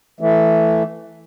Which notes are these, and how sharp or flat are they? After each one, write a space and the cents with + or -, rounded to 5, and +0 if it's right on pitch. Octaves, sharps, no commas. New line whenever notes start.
E3 +5 A3 +0